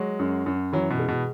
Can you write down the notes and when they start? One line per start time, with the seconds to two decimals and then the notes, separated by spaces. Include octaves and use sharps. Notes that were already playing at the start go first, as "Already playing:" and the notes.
Already playing: F#3 G#3
0.19 F#2
0.46 F#2
0.73 E3 F#3
0.90 B2
0.99 G#3
1.08 B2